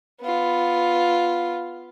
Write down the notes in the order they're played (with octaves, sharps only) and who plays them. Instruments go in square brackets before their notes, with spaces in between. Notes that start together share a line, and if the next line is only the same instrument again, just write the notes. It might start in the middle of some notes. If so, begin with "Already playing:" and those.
[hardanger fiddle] B3 F4